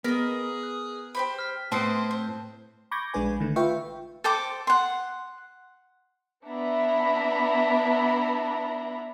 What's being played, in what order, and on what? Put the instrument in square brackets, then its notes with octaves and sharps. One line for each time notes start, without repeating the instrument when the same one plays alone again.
[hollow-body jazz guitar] B3 [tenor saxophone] G#4 [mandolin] A#4 D#5 [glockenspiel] F6
[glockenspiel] F#6
[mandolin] G4 C5 B5
[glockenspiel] F6 B6
[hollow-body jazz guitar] A2 [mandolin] B3 G#4 C6 [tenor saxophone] C4 [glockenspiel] A5
[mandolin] C5
[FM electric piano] B5 C#6 D6 G6 G#6 A#6
A#1 G#3 D4 B4 G#5
D3 D#3 A3
F4 B4 E5 F5 G5 C#6
[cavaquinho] A4 C5 G5 D6
F#5 C6
[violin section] B3 D4 E4 E5 A#5 B5